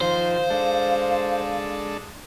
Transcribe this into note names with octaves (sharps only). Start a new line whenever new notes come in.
D#3 F3 C5 F5
G#3 D4 A4